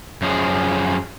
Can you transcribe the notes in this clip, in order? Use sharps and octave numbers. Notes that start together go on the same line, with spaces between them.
F#2 F3 G#4